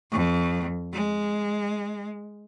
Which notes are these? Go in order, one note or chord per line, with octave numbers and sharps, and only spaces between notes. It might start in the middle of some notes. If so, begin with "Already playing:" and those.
F2
G#3